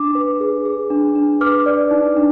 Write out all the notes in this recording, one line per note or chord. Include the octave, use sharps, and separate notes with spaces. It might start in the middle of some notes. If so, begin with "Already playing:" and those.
Already playing: D4 D6
B4
G#4
G#4
D4
D4
B4 D6 F6
D5
D#4
D4